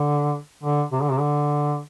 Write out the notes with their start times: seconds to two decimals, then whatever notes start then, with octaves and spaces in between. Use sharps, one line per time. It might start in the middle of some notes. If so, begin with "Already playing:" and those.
Already playing: D3
0.63 D3
0.92 C3
1.01 D3
1.11 C3
1.20 D3